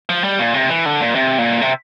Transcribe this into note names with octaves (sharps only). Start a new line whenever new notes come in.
F3
G3
A#2
C3
E3
D3
A#2
C3
A#2
C3